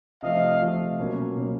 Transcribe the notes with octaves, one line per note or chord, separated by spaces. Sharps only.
C3 F3 A3 D#5 F5
C3 F3 A3
B2 F#3 A#3 C#4
B2 F#3 A#3 C#4